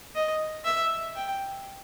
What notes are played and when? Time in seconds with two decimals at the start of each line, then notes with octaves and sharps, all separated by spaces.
0.15 D#5
0.65 E5
1.16 G5